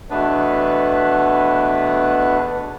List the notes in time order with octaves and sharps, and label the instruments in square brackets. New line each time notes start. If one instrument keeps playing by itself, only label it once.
[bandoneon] E2 B2 A3 B3 D4 B4